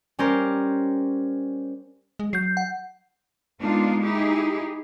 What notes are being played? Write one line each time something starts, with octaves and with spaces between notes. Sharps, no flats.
G3 C#4 G4 A#4 C5
G#3
F#3 G6 C7
F#5
G#3 A#3 B3 D4 D#4 F4
D#4 E4 G4 G#4